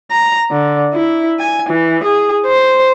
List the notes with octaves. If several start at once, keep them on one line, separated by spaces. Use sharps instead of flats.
A#5
D3
E4
G#5
E3
G#4
C5